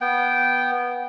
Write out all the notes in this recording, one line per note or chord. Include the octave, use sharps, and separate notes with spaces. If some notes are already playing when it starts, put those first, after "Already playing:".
B3 G5